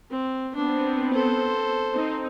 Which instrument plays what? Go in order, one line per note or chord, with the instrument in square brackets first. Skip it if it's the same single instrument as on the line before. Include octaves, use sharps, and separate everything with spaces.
[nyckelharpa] C4
[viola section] B3 C4 [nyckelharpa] D4
[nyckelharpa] A4 C5
[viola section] C4 D#4